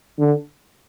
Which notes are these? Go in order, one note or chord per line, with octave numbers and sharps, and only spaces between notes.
D3